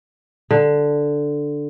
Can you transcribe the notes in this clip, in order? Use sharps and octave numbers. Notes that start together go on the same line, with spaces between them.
D3